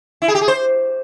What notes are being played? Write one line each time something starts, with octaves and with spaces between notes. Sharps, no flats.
E4
G#4
G4
G#4
C5